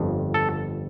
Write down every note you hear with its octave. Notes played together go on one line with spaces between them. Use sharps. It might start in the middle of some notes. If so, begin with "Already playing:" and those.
Already playing: G1 F2
A4